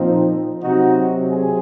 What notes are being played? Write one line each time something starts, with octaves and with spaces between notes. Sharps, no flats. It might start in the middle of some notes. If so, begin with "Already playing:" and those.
Already playing: A#2 F3 A#3 C4 D#4
C3 F#3 C4 D#4 F#4
G#4